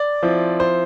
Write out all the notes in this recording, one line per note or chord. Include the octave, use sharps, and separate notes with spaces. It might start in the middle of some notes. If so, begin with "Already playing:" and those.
Already playing: D5
F3 C4 E4
C5